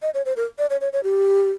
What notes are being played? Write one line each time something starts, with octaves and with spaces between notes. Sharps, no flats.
D#5
C#5
C5
A#4
D5
C#5
C#5
C#5
G4